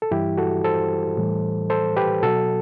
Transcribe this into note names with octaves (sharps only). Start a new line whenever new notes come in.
A4
G2 E3 G3 E4 G4
F#4 A4
A4 C5
A2 E3 G3
A4 C5
G4 B4
B2 F#3 F#4 A4